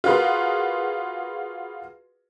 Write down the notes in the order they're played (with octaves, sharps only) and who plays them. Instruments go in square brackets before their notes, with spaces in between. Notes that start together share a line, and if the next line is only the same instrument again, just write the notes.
[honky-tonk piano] F4 F#4 G#4 A#4 B4 C6